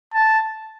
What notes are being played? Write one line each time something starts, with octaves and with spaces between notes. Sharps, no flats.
A5